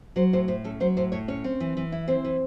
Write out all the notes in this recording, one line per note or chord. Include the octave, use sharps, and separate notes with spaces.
F#3 C5
A2 C5
A2 C5
C#4 A4
F#3 C5
A2 C5
A2 C#5
C#4 C#5
C4
E3
E3
E4
C4 C5
E3